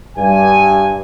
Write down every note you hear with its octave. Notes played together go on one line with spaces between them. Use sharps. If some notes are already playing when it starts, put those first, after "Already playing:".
G2 G#5